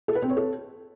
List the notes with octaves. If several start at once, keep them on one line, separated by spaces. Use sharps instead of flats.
A4
B4
C4
C#5
A4